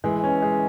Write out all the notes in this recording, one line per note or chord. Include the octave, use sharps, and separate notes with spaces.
E3 G#3
C#4
G#3